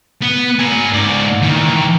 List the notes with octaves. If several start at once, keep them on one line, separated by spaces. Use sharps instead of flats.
B3
A#4 G#5
G#2 D5
D#3 E3